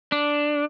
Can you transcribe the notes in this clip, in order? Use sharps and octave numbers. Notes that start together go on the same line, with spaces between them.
D4